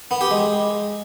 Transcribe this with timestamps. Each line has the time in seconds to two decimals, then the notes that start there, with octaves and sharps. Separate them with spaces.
0.11 B3
0.21 G4
0.31 G#3